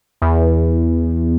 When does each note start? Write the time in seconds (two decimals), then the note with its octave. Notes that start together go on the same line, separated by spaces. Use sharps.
0.22 E2